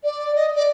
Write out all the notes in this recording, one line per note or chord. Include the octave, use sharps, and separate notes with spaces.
D5
D#5
D5